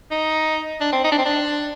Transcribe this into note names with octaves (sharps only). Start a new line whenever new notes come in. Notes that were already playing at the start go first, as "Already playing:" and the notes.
D#4
D4
C4
D#4
D4
C4
D4